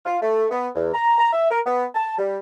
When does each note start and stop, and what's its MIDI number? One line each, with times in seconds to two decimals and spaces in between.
0.05 0.18 65
0.22 0.46 57
0.51 0.68 59
0.75 0.91 40
0.94 1.18 82
1.18 1.30 82
1.33 1.49 76
1.50 1.60 70
1.66 1.87 59
1.95 2.16 81
2.18 2.38 55